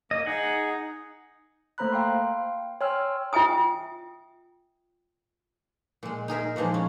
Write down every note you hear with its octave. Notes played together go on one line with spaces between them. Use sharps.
A#3 D#5
D#4 G#4 F#5
A3 A#3 C5 A#5 B5 F#6
F5 G5 C6
C#5 G5 G#5 C6 E6 F6
F4 E5 G5 G#5 D#6
A#2 G#3
D#4 G#4 A#4 E5
A#2 E3 F3 G#3 A#3
C#4